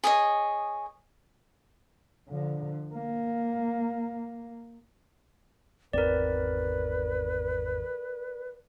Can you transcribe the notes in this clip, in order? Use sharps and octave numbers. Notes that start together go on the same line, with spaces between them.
G#4 C#5 D#5
D3 F3
A#3
G#1 E2 C4 A#4 B4 D5